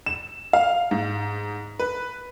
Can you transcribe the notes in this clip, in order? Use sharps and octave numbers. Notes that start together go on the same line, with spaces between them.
E7
F5
G#2
B4